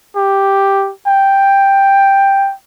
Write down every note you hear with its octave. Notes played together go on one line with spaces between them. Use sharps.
G4
G5